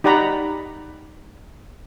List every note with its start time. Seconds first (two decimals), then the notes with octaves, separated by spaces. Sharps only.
0.04 D#4 G4 D5 F#5 A#5 B5